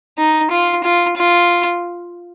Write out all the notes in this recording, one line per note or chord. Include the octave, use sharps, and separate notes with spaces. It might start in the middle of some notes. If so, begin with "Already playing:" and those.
D#4
F4
F4
F4